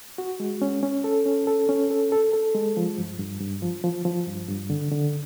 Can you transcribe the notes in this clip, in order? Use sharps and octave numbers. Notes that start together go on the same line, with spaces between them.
F#4
G#3
C#4
C#4
A4
C#4
A4
C#4
A4
A4
A4
G#3
F3
G2
G2
G2
F3
F3
F3
G2
G2
D3
D3